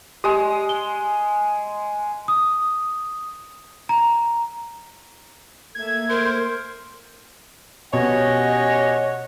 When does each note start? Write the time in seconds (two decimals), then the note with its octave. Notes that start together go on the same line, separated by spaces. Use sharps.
0.24 G#3 G4 D#6
0.69 G7
2.28 D#6
3.89 A#5
5.75 A3 A#3 E5 G#6
6.09 A#4 C5
7.93 B2 C#4 G4 C#5 D#5 F#5